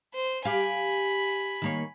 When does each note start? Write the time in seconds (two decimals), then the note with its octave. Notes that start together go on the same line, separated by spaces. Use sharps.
0.15 C5
0.45 G4 F5 G#5 B5
1.62 D#3 A#3 C#5